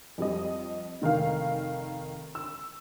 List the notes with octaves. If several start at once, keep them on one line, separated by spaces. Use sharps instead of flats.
F2 G3 D#5
F1 D#3 A#4 F5
E6